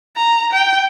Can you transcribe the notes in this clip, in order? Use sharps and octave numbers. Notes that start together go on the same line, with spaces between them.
A#5
G5